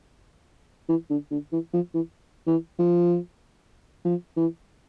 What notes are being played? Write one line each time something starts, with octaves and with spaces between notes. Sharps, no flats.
E3
D3
D3
E3
F3
E3
E3
F3
F3
E3